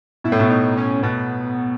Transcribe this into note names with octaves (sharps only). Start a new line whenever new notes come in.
B2 E4
A2
B2
D#4
C#4
B2 B3